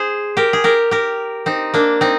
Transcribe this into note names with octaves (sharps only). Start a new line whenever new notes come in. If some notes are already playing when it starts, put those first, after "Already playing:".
Already playing: G#4 C5
G4 A#4
G#4
G4 A#4
G4 A#4
C4 D#4
A#3 D4
C4 D#4